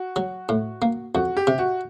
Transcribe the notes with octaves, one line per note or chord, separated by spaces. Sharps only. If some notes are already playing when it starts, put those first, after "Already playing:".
Already playing: F#4
F#3
A2
A#3
F2 F#4
G4
C3
F#4